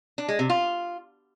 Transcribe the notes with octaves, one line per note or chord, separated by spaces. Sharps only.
D4
G#3
C3
F4